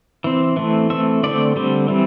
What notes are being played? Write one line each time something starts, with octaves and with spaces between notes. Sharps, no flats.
E3 C4
E3 A3 C4
E3 A3 C4 E5
D3 A3 C4 D5
D3 G3 C4
E3 G3 C4